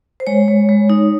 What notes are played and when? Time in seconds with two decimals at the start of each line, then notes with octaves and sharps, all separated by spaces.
0.20 C5
0.27 G#3 C#5
0.48 G#3
0.69 G#3
0.90 D#4